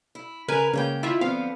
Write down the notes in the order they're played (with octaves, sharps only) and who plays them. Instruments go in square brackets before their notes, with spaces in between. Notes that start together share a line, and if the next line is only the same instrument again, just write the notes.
[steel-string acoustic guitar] E4
[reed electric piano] C#3 [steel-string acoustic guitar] A#4 [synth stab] B4 G#5
[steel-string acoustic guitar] G#2 C#4 G5 [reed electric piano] C#3 A#3
[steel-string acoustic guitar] D#3 E3 [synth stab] E4 F4 E5
[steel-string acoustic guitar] D3 F3 B3 [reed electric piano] C4 [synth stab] F5